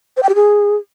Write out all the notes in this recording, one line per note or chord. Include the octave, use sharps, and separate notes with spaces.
C5
G5
G4
G#4